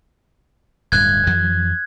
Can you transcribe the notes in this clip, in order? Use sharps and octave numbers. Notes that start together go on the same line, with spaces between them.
D1 G2 F#6 G#6
F2 E3 F#3